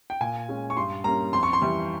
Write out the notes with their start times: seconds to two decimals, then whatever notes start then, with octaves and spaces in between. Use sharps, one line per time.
0.10 G5
0.21 A#2 G#5
0.49 G#3 C#4
0.70 C#6
0.77 G2 C6
1.04 G3 A#3 C#4 A#5
1.33 F2 C6
1.43 C#6
1.53 C6
1.62 E3 G3